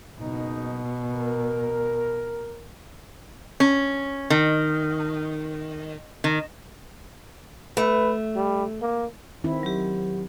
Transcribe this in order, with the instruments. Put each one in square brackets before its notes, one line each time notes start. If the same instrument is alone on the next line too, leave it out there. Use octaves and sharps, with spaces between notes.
[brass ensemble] F#1 D#4 [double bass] B2
[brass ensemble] A#4
[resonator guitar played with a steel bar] C#4
D#3
D#3
[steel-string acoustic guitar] A3 [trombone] B4
[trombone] G3
A#3
[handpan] D#3 C4 E4
[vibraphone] F#3 G4